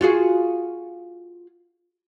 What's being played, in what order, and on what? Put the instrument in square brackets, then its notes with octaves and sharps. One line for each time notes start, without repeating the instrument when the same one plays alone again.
[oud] F4 F#4 G#4